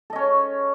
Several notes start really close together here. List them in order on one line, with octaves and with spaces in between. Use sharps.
A4 D#5 C#4 C#5